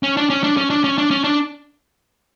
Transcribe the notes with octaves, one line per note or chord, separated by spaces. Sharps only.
C#4
D4
C#4
D4
C#4
D4
C#4
D4
C#4
D4